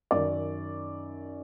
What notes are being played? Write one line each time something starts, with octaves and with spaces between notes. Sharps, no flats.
F#2 D#3 D5